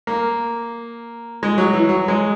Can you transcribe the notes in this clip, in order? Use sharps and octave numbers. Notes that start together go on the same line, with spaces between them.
A#3
G#3
F#3
E3
F#3
G#3